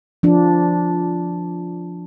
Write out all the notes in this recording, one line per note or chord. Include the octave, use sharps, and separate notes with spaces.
F3 D4